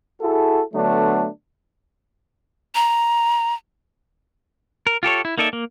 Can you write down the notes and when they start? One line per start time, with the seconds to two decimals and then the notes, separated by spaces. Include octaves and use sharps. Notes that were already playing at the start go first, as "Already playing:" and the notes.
0.21 E4 F#4 G#4 A4
0.74 D3 F#3 A3 B3 D4
2.75 A#5
4.87 A#4
5.03 F4 G4 A4 C#5
5.25 E4
5.38 A#3 D#4 A4 D5 E5
5.53 A#3